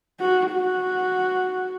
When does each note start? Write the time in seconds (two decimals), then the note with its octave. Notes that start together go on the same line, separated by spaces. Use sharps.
0.20 F#4
0.52 F#4